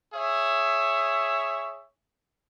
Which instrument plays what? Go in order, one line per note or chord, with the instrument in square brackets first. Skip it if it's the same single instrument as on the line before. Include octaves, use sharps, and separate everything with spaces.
[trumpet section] G#4 C#5 E5